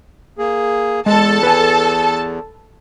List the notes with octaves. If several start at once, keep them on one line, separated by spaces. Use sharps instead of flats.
A#3 G#4
E2 G#3 A4 A5
B4 G#5